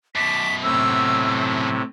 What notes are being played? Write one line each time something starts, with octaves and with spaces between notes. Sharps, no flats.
F#2 B2 A5 D6 B6
A2 C3 E6